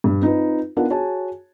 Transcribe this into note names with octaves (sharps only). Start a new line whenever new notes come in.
G2 G3
C4 D#4 F4 B4
B3 D4 D#4 F4 A#4 F#5
F#4 G#4 C#5 G#5 A5